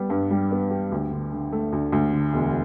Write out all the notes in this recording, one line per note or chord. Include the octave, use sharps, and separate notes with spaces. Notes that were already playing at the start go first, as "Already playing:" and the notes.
Already playing: G3 B3
G2
G3
B3
G4
D2
D3
D3
A3
D2
D2
D3
E1